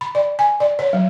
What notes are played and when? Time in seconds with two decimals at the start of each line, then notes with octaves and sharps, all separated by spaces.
0.01 B5
0.15 D5
0.39 G#5
0.60 D5
0.79 C#5
0.93 F#3